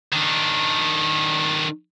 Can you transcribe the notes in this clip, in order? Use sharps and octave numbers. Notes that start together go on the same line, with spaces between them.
D#3 D4